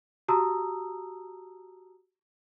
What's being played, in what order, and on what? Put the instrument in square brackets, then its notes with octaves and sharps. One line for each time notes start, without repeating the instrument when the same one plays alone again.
[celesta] F#4 G4 A5 A#5 D#6 E6